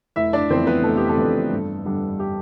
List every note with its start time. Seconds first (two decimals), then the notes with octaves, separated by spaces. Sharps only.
0.16 F1 E4 E5
0.33 D4 D5
0.50 F2 E3 B3 C4 D4 C5
0.67 B3 B4
0.84 F1 A4
0.97 G4
1.09 A4
1.17 F2 E3 B3 D4
1.51 G2
1.85 D3 G3 D4
2.19 G4